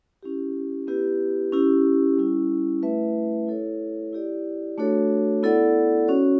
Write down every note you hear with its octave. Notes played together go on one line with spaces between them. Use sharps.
C#4 E4 G4
B3 E4 G4 B4
C#4 E4 G4
G3 C#4 E4
A3 E4 B4 E5
E4 A4 C#5
E4 G4 D5
A3 D4 F#4 A4 C#5
B3 E4 A4 D5 F#5
C#4 F#4 C#5